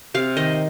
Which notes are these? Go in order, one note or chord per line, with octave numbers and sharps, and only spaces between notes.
C3 F5
D#3 D#5